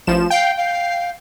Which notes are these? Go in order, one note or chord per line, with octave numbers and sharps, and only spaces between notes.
A1 F3 E7
F5 G5
F5